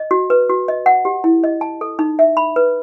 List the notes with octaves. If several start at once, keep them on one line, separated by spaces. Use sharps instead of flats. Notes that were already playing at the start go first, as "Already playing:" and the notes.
Already playing: D#5
F#4
B4
F#4
D#5
F#5
G4
E4
D#5
A5
A4
D#4
E5
B5
B4